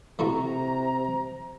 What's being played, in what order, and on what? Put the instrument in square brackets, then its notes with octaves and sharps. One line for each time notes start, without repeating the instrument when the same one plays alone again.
[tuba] C3 [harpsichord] A3 E4 F#4 [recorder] A#5